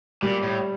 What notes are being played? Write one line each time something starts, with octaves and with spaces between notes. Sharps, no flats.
A#2 G3
A2